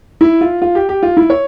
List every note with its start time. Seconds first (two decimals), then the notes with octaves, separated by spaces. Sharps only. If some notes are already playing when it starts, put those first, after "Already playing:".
0.21 E4
0.41 F4
0.62 F4
0.75 G4
0.89 G4
1.03 F4
1.17 E4
1.30 C#5